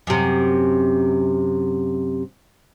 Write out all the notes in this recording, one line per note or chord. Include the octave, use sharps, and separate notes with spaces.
F#2 C3